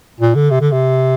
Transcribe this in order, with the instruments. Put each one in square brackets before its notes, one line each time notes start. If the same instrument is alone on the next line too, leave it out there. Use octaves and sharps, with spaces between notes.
[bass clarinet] A#2
D3
C3
D3
C3